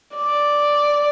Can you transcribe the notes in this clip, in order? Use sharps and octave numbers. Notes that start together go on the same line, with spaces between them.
D5